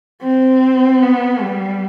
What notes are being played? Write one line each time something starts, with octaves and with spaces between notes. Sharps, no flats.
C4
B3
G3